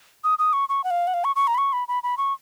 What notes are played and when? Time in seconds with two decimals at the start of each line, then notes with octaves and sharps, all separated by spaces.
0.24 D#6
0.39 D#6
0.53 C#6
0.69 C#6
0.84 F#5
0.91 F5
1.07 F#5
1.14 F5
1.24 C#6
1.36 C#6
1.47 A#5
1.54 B5
1.58 C#6
1.73 B5
1.88 B5
2.03 B5
2.18 C#6